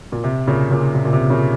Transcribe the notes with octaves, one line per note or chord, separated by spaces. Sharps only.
A#2
C3
A#2 C#3
A#2 C#3
A#2
A#2
C3
A#2 C#3